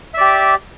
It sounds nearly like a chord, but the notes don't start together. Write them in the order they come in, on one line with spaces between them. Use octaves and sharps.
E5 D5 G4